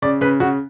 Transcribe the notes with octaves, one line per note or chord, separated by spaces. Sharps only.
C#3 D5
C#3 B4
C#3 F#4